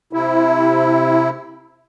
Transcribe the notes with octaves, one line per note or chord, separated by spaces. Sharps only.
C3 E4